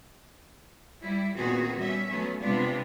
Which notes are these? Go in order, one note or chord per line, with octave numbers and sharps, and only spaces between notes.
G3 E4
A#2 D#3 B3 C4 F#4 G#4
G3 C#4 E5
F#3 A3 B3 C#4
C3 G3 G#3 B3 D4 F4